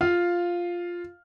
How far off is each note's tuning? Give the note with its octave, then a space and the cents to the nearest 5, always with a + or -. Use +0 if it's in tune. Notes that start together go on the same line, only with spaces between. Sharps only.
F4 +0 F5 +0